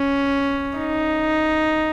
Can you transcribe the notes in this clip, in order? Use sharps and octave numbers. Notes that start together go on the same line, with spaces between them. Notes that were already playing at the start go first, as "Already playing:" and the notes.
Already playing: C#4
D#4